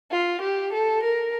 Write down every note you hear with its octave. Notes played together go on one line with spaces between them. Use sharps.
F4
G4
A4
A#4